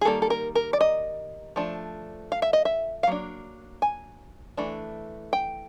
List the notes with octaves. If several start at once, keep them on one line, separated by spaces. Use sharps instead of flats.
G#4
D#3 G3 A#3 A4
A4
A#4
A#4
D5
D#5
F3 A3 D4
F5
E5
D#5
E5
F5
F#3 A#3 D4
G#5
E3 A3 D4
G5